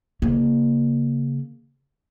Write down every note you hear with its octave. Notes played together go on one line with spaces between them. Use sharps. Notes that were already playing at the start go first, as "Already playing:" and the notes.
C#3 A#3